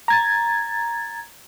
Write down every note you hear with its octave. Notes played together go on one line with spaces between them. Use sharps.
A#5 G#6 A6